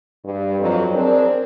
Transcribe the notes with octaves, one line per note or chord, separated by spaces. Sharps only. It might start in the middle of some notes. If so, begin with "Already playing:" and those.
G2
F2 F#3
C4 D4 G#4 A#4